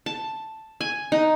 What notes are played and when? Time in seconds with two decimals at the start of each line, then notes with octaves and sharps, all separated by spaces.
0.06 A5
0.81 G#5
1.12 D#4